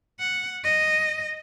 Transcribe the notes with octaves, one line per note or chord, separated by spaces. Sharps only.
F#5
D#5